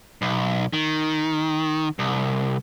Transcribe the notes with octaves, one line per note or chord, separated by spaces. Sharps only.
B1
D#3
C2